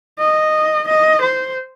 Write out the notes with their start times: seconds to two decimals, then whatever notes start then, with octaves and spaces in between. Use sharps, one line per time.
0.19 D#5
0.88 D#5
1.22 C5